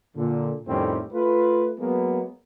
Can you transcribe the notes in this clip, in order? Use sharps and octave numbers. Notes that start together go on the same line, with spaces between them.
A#2 D3
F2 A2 D#3 G3 C4 C#4
A3 F4 B4
F#3 G#3 A#3 B3